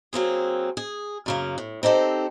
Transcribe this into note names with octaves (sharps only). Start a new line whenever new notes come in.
F#3 A#3 C4 G#4
G#4
F#2 C#3 A#3
A2
C4 D#4 G4 A4 C5